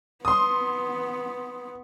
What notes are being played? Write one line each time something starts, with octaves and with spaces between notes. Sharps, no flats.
B3 C6 D#6